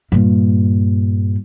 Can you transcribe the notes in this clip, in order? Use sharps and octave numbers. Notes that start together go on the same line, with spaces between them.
G2 A#2